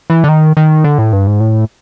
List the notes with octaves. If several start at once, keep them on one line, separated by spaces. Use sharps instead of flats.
E3
D3
D#3
D#3
D3
A2
G2
G#2
A2